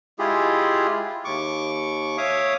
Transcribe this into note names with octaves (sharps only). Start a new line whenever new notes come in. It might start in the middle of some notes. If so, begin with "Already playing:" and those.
G#3 E4 F4 G4 G#4
D#2 C#6 D6
C#5 E5 F5 D6 D#6